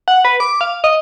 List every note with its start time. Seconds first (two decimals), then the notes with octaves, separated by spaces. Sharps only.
0.08 F#5
0.25 B4
0.40 D6
0.61 F5
0.84 D#5